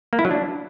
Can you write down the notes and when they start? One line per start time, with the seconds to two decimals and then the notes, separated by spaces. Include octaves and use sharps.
0.13 A#3
0.19 E4
0.25 F#3
0.31 D4